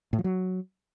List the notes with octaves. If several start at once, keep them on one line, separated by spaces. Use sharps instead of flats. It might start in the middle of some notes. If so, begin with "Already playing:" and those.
A2
F3
F#3